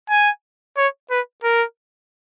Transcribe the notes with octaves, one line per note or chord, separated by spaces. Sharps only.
G#5
C#5
B4
A#4